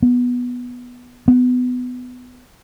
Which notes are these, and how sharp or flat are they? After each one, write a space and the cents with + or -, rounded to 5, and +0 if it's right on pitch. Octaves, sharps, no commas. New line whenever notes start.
B3 -5
B3 +20